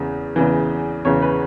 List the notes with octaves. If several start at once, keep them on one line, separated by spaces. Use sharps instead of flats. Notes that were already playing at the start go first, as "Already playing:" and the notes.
Already playing: E2 C#3 E3
E2 C#3 E3
E2 C#3 E3 C#5
B4